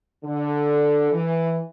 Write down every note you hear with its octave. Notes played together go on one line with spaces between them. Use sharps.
D3
E3